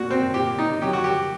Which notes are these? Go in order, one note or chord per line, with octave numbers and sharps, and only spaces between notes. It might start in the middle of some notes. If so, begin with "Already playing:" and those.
Already playing: A#2 F#4
C4
A#2 G4
D#4
F#3 G4
F#4
G4